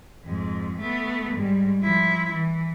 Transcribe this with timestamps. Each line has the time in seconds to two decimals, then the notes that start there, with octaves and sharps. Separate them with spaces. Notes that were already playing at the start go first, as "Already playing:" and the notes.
0.23 F2 G#2
0.79 A3 B3
1.34 G#2 G3
1.81 F3 E4
2.32 E3